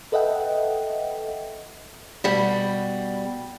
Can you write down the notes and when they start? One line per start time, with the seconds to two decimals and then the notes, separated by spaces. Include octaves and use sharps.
0.12 A4 B4 D#5 E5 F#5 G5
2.24 B2 G3